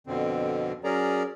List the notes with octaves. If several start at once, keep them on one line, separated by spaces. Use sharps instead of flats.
F2 B2 D3 C4
F#3 C#4 G#4 A#4 D5 A#5